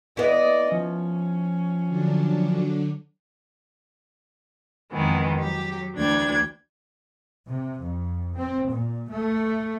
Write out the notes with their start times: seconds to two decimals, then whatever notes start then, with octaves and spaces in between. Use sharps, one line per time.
0.17 B3 E4 D5 D#5
0.72 F3 C#4
1.88 D3 F#3 D4
4.92 F2 D#3 E3 G#3 B3
5.38 F#3 G4
5.95 D2 E3 A3 D4 G5 G#6
7.47 C3
7.81 F2
8.36 C4
8.71 A#2
9.10 A3